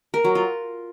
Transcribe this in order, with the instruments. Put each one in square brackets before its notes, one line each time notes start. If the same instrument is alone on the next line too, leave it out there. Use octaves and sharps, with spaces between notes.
[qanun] A#4
F#3
F4